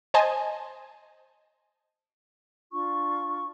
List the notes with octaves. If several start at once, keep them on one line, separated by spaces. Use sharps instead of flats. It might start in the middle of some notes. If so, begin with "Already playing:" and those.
C5 D#5 G#5 A5
D4 F4 C#6